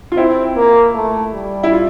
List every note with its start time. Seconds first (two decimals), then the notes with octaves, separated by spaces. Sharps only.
0.12 F4
0.17 C4 E4
0.57 A#3
0.95 A3
1.34 G3
1.64 E4
1.72 F4